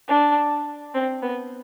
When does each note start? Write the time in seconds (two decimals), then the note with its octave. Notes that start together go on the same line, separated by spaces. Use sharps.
0.08 D4
0.94 C4
1.23 B3